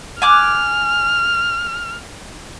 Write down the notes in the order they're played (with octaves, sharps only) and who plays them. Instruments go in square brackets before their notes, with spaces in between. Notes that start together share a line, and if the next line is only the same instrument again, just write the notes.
[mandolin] G#5 D6 F#6 [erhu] F6